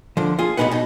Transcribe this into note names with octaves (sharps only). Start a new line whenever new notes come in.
D3 F3
F4 G#4
B1 B2 A3 D#4 B4 F#5
B2 D#4